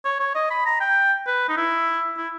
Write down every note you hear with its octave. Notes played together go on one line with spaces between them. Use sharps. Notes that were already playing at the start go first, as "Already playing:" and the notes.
C#5
C#5
D#5
B5
A#5
G5
B4
D#4
E4
E4